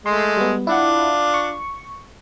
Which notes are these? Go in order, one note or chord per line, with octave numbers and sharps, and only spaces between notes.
G#3 A3 C6
G3 B3
D4 E4 F4 F#5
C#6